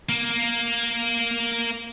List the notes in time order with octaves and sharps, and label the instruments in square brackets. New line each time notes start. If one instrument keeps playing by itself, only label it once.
[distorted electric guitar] A#3